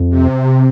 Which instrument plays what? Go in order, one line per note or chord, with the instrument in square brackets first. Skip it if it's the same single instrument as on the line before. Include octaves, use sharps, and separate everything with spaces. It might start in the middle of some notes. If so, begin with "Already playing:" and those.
Already playing: [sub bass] F2
[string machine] C3